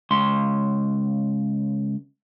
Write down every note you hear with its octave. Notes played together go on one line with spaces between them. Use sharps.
C#2 C6